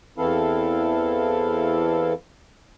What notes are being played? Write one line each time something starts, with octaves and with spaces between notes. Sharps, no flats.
E2 E3 C4 E4 A4 F5